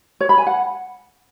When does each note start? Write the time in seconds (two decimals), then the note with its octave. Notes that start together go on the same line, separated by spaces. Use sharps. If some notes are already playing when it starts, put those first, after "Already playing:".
0.21 C#5
0.29 B5
0.38 G#5
0.47 F#5